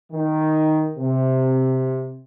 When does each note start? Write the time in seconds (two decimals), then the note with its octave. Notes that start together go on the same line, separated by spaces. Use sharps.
0.11 D#3
0.97 C3